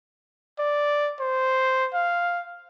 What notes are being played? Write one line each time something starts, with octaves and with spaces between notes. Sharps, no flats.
D5
C5
F5